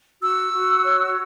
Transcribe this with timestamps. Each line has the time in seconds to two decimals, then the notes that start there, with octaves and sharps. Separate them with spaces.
0.21 F#4 E6
0.53 F#4
0.84 C#5